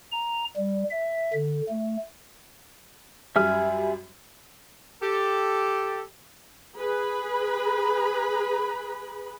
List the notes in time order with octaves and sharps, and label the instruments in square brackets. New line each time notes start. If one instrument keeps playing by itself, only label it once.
[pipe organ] A#5
G3
E5
D3
A3
[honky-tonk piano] F#2 G3 [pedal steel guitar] E5 G#5 F6
[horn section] G4 A4
[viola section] G#4 B4 B5